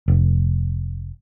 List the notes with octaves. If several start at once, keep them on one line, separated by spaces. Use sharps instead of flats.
F1